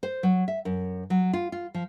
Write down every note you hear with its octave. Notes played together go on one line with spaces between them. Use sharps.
C5
F#3
E5
F#2
F#3
F4
F4
F3